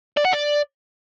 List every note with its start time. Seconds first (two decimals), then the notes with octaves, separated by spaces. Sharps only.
0.17 D5
0.25 F#5
0.33 D5